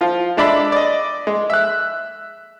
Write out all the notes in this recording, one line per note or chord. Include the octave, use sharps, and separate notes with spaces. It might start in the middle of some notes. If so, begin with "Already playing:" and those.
F3 F4
G#3 D4 D5 E5 B5
D5 D#5
G#3
E5 F#6